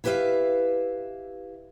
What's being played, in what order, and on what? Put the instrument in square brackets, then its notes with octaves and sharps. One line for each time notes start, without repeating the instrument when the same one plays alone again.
[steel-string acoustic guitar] E4 G4 B4 C5 E5 F5